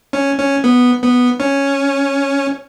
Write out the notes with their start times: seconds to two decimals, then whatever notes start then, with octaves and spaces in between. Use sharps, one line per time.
0.13 C#4
0.38 C#4
0.64 B3
1.02 B3
1.40 C#4